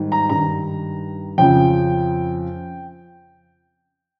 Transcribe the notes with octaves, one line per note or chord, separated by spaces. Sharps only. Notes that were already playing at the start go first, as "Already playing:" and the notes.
Already playing: G#2 D#3 G3
A#5
G2 D#3 G3 A#5
F2 C#3 F3 G5